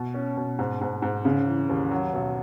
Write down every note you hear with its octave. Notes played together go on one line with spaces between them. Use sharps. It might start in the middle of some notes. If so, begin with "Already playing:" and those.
Already playing: B2
C#4
B2
G#2
G#2
G#2
C#3
E3
D#2
F#3
B1